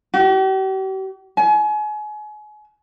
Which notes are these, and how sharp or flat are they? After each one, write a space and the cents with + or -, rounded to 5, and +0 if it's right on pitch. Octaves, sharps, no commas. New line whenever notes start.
G4 -45
G#5 +30